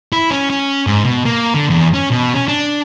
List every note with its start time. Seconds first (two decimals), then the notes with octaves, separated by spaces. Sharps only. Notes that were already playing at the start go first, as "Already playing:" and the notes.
0.13 E4
0.31 C#4
0.50 C#4
0.87 G#2
1.05 B2
1.25 A#3
1.54 D3
1.70 E2
1.94 C#4
2.11 B2
2.34 C#4
2.48 D4